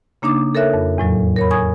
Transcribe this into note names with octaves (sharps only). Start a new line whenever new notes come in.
C#3 A#3 D4 D#4 D6
A4 A#4 C#5 E5 F#6
F2
E2 A2 F#3
A#4 C#5 B5
G#5 C#6 D#6 G#6